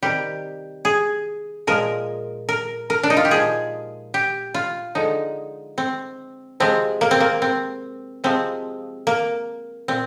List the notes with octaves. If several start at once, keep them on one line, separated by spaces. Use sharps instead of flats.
C3 D#3 G3 G4
G#4
A#2 F3 G#3 A#4
A#4
A#4
D4
D#4
F4
G4
A#2 F3 G#3 G#4
G4
F4
D3 F3 G#3 D#4
C4
C3 F3 G#3 C4
A#3
C4
A#3
C4
C3 F3 G#3 C4
A#3
A#2 C4